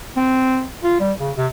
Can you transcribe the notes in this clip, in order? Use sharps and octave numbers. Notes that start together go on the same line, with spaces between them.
C4
F4
G3
C#3
C3